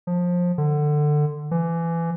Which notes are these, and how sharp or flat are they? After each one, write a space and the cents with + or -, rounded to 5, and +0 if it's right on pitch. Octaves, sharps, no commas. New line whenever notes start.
F3 +20
D3 +20
E3 +25